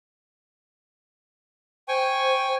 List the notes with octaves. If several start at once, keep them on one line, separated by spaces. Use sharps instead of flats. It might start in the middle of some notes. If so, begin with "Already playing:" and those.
C5 G5 G#5 C#6